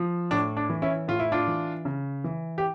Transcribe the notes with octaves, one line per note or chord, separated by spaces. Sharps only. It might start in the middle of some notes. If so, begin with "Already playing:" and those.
Already playing: F3
A2 D4
D4
E3
C#4 E4
A2 F4
E4
D4 F4
E3
C#3
E3
G4